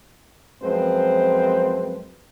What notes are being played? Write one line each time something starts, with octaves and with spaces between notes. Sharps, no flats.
F#2 F3 G#3 C4 B4 C5